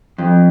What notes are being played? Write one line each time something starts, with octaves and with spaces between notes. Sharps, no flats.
F2